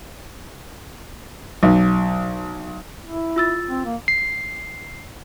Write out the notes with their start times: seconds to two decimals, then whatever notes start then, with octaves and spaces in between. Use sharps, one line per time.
1.63 B1
3.05 E4
3.36 F4 E6 A6
3.68 C4
3.85 A#3
4.08 C7